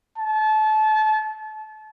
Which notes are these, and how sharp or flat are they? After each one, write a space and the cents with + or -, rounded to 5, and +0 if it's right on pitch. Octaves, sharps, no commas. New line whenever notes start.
A5 -30